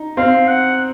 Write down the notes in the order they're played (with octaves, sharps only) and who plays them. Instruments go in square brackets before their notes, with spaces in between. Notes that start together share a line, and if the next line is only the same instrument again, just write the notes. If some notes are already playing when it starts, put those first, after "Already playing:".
Already playing: [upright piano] D#4
[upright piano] C4 [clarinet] F5
[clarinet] F#5